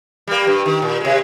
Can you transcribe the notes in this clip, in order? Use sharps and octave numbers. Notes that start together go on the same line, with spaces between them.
G3 A#3
G2
D#3
A#2
C3 G#3